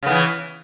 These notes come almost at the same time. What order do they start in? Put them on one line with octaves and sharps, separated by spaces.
C#3 B3 E3